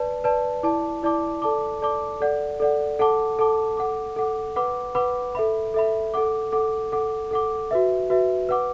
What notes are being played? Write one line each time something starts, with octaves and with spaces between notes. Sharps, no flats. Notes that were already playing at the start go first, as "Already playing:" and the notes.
Already playing: B4 D5 A5
B4 D5 A5
E4 D5 A5 D6
E4 D5 A5 D6
A4 D5 A5 D6
A4 D5 A5 D6
A4 D5 F#5
A4 D5 F#5
A4 F#5 A5 D6
A4 F#5 A5 D6
A4 F#5 D6
A4 F#5 D6
B4 F#5 B5 D6
B4 F#5 B5 D6
A4 E5 B5
A4 E5 B5
A4 F#5 D6
A4 F#5 D6
A4 F#5 D6
A4 F#5 D6
F#4 B4 E5
F#4 B4 E5
B4 F#5 D6